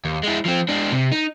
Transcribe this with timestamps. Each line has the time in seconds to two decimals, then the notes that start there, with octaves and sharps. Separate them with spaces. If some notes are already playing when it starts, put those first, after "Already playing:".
0.05 D#2
0.24 G#3 E4
0.46 F3 C4
0.69 G#3 D4
0.92 C3
1.12 D#4